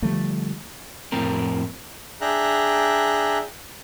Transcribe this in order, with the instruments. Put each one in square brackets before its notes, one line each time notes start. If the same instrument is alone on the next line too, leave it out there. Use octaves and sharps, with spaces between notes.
[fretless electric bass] D3 F3 G3 A3
[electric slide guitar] F2 A2 C4 A#4
[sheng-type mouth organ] D4 G#4 E5 G5 A#5 F#6